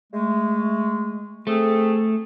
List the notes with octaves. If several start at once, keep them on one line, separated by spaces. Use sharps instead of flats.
G#3 A3
A3 C4 G#4 A4